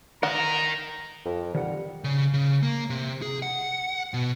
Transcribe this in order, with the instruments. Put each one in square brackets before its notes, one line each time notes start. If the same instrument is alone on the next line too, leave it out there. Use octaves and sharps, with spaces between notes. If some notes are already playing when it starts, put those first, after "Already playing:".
[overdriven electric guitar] A#4 D#5 [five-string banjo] F#5 [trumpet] A#5
[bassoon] F2
[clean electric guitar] D#3 A#4 F#5 [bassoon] G3
[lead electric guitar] C#3
C#3
A#3
C3
G#4
F#5
B2